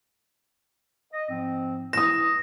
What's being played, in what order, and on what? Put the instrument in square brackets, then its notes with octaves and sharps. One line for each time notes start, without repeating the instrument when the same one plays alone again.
[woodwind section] D#5
G#2 F3 C4
[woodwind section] E3 E4 [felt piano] D#6 E7 [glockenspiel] A#6